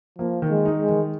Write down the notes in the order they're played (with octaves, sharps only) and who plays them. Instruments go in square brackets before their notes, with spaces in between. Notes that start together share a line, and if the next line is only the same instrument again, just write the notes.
[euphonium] F3 [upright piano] A#3
[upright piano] D#3
[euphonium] G#3
[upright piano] D#4
[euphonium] G#3
[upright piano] D#3